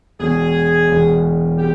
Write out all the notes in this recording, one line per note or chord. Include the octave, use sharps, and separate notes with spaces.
E1 E2 B2 G#3 G#4
E1 E2 B2 G#3
B2 G#3 G4